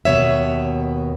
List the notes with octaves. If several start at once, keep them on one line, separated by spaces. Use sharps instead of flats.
D#2 B2 G#3 C#5 E5